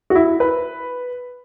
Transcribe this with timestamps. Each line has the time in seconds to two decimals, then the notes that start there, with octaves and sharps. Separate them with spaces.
0.10 F#4
0.15 E4
0.40 B4